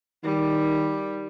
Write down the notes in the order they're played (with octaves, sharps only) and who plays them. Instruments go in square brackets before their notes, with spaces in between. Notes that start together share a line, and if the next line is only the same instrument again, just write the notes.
[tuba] D#3 [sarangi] G3